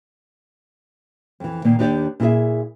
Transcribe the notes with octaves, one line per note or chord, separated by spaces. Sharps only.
F2 E3
A#2 D#3 A#3
D#2 D4 G4 D5
A#2 E4 F#4 G#4 E5